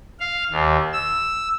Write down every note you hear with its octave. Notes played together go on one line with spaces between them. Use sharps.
F5
D#2
E6